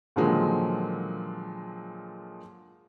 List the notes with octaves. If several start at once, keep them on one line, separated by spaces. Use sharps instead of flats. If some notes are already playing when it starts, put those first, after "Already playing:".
A#2 D3 D#3 F3 F#3 G#3